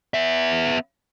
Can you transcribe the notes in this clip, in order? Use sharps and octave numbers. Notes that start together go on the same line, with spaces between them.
B3 E5